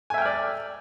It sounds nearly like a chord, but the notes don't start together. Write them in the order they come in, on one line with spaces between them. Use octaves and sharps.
G#5 E5 G5 F6 D5